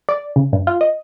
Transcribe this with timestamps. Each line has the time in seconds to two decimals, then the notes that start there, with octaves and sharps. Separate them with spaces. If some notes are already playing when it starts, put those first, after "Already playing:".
0.09 D5
0.36 C#3
0.53 G2
0.67 F4
0.81 D#5